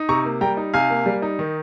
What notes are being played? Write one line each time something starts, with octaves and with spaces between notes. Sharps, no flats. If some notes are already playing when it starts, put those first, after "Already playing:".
Already playing: D#4
C3 A#5 C#6
A#3
G3 G5 A#5
D#4
C3 F5 G#5
A#3
G3
D#4
D#3